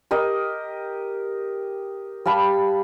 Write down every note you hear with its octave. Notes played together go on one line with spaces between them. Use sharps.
G4 A#4 D#5
G3 F5 A5 B5